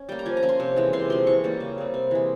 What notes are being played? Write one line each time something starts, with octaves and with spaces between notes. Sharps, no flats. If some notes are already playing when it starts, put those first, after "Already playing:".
Already playing: C#4
G3 A#3 G5
A#5
F3 G#5
A#5
A#3 C#4
C6
C3
E3 G#3
C3 C6
F3 C4 C6
E3 C#6
G3 A#3 C#4
C#3
G3 C4
C3
E3 G#3